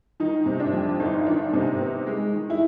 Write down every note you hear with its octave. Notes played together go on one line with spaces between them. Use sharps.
D#3 D#4
C3
D4
F2
G1 D#4
D#3 D4
C3 D#4
B3
G#3
D#3
E4